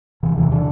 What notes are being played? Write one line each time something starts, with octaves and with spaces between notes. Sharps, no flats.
C3 E3
E2 E3
D3